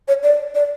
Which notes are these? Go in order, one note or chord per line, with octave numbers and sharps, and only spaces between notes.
C#5
D5
D5